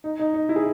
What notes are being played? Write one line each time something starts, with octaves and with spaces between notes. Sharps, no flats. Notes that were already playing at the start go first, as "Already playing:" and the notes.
D#4
D#4
D#4
E4
G#4